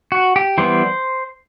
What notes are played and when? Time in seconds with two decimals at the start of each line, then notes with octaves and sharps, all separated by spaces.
0.12 F#4
0.36 G4
0.58 E3 G3 B3 C5